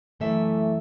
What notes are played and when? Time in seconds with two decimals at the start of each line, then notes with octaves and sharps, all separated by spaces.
0.20 F#2 E3 A3 E5